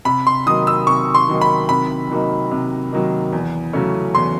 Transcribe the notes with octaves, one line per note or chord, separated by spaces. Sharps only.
C3 B5
C6
D#3 F#3 A#3 D#4 D#6
E6
C3 C#6
C6
D#3 F#3 A#3 D#4
B5
C3 B5
D#3 F#3 A#3 D#4
C3
D#3 F#3 A#3 D#4
E2
C#3 F#3 A3 C#4
E2 C6